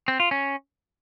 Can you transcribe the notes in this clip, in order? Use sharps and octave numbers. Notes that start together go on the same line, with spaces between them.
C4
F4
C#4